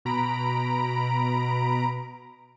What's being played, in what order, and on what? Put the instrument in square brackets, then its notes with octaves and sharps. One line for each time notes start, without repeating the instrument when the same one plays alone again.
[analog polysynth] B2 A#5 B5 D7